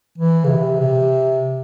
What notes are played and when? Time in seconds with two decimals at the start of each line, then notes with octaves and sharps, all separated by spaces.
0.18 E3
0.44 C#3
0.49 C3
0.80 C3